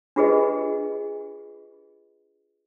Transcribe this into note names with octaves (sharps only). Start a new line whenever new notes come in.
D4 F4 G4 G#4 B4 D#5